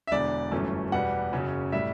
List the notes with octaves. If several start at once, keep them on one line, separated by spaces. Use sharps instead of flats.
E5
E1 E2 D3 D5
G1 F#2 E3 A3 C#4
E2 B2 G3 B3 F#5
F#1 F#2 C#3 F#3 C#4
A2 G3 E5